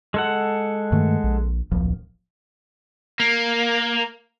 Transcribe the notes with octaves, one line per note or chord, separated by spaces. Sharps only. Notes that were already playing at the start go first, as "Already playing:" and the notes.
G#3 A4 F#5
G2 D#3 A3
A#1
D1 A#1 F3
A#3